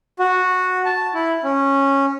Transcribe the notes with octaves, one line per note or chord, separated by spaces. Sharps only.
F#4
A5
E4
C#4